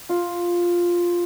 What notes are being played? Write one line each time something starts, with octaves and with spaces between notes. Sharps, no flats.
F4